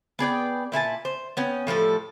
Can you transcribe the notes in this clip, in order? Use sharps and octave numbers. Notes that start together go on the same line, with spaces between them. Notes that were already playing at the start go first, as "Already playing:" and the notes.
B3 G#4 D5 G5
A#2 E4 G#5 A5
C5
B3 C#4 G5
A2 F3 G3 A4